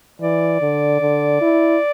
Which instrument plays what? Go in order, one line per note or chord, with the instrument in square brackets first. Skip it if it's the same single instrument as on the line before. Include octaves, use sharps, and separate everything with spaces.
[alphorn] E3 [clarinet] D5
[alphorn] D3
D3
E4